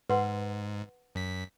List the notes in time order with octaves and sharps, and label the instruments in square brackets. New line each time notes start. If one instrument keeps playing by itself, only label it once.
[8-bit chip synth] G#2 [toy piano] B4 F#5 C6
[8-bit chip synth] F#2 B6